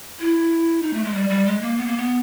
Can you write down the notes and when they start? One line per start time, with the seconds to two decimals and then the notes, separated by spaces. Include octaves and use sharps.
0.20 E4
0.82 D#4
0.94 A3
1.04 G#3
1.14 G3
1.29 G3
1.46 G#3
1.61 A#3
1.77 B3
1.87 A#3
1.97 B3